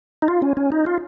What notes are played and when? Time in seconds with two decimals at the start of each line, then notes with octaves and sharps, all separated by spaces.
0.22 D#4
0.28 F4
0.42 C#4
0.57 C#4
0.72 D#4
0.86 F4